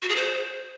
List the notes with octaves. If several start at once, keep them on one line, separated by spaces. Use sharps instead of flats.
F#4
G#4
C5